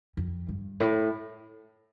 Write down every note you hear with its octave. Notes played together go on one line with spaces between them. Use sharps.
F2
G2
A2